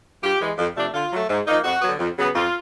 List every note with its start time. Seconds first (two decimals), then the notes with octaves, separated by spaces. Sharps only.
0.23 G2 F4 G4
0.41 E3 G#3
0.58 F2
0.76 C3 F3 A3 D4
0.94 D3 F4
1.12 F#3 A3
1.30 G#2
1.47 F3 A#3 D#4
1.64 F2 F#4
1.82 D3 F#3 B3
1.99 F2
2.17 C#3 F#3 B3
2.35 F2 F4